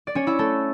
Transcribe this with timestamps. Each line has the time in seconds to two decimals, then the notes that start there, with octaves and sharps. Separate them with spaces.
0.07 D5
0.15 C#4 C#5
0.27 E4 E5
0.39 A3 A4